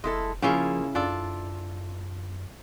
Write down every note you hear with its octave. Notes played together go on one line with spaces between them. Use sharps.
F1 G#3 E4 A4
C#3 F3 A#3 C#4 E4 F4 G#4
F#2 D4 F4 A4